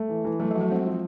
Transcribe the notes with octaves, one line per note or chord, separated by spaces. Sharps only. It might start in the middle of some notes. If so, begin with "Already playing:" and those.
Already playing: A3
E3
E3
F#3 A3
F3
F#4
F#3
G#3 C4
F3